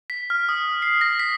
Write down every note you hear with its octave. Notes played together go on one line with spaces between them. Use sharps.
B6
F6
D#6
C7
A#6
B6